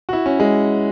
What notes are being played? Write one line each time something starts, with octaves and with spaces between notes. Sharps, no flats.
F#4
E4
C#4
G#3